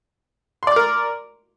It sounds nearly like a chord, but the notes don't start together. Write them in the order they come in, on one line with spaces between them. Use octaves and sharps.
C6 D5 D6 A#4